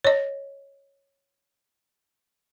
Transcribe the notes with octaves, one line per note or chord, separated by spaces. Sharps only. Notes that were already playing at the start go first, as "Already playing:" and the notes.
C#5 D#5